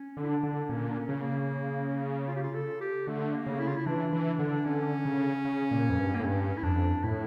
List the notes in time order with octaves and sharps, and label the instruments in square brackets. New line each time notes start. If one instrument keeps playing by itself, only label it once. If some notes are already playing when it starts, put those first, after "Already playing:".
Already playing: [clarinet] C#4
[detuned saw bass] D3
[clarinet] E4
D4
[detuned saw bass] D3
[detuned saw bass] A#2 [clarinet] C#4
[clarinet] D4
C#4
[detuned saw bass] C#3
[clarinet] A#3
F4
G4
F4
A4
G4
[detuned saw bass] D3 [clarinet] A3
[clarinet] A#3
[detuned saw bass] C#3
[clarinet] E4
F4
E4
[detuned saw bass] E3 [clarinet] D4
[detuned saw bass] E3
D3
[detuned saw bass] D3 [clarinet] C#4
[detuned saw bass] C#3
C#3
A#2
F2
G2
[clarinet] A#3
[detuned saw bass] A2
[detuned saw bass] G2 [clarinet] C#4
[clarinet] E4
[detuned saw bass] F2 [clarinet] D4
[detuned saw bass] A2 [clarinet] E4